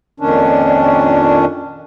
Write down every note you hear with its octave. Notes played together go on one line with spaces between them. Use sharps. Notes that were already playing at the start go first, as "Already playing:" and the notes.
F2 A#2 D#3 C#4 D4